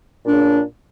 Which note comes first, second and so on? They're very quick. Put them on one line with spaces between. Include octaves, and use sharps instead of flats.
A#2 D4 C#3